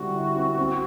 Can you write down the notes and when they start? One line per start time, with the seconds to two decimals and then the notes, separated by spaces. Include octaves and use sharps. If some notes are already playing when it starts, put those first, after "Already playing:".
Already playing: D3 G3 C4 E4 F#4
0.16 E4
0.36 C4
0.59 C4